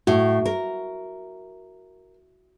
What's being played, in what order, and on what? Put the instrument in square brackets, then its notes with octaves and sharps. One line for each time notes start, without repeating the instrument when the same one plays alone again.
[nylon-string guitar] A2 [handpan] F#4
[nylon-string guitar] A#4